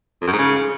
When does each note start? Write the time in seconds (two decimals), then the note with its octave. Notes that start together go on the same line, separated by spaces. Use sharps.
0.21 F2
0.27 F#2
0.33 G#2
0.38 C#3